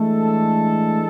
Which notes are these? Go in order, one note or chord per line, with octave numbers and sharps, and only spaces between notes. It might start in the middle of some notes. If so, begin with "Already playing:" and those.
Already playing: E3 G#3 A3 D4 A4